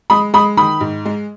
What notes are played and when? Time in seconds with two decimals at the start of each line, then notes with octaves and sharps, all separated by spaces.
0.10 G#3 B5 D#6
0.34 G#3 B5 D#6
0.57 D#3 B5 D#6
0.81 G#2
1.05 G#3